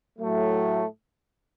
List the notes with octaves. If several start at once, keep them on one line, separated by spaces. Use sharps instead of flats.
A2 F#3 A3